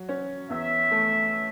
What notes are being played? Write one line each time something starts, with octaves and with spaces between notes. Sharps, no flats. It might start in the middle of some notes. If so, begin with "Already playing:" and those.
Already playing: F#3
C#4
E2 E5
A3